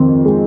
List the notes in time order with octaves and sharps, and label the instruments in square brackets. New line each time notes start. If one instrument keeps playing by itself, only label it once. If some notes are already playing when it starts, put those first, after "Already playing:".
Already playing: [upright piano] F2 D#3 C4
G#3